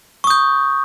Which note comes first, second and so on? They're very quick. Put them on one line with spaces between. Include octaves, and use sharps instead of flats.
C#6 D#6 G6